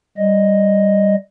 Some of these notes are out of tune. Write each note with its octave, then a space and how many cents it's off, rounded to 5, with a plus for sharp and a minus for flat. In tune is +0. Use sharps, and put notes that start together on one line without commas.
G3 +0 D#5 +0